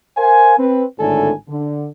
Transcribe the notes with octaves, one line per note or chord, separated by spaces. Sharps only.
A#4 C5 F5 G#5
C4 B4
G#1 A2 D3 D4 A4 G#5
D3